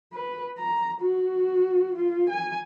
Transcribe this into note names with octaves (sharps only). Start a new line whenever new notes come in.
B4
A#5
F#4
F4
G#5